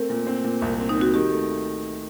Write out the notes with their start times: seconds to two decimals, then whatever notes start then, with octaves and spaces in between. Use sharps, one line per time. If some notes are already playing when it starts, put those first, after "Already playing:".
Already playing: A3 C4 A#4
0.10 A#2
0.27 C4
0.44 A#2
0.62 C2
0.79 C4
0.89 D#4
0.97 C4 F#4
1.14 D#3 G4
1.31 A3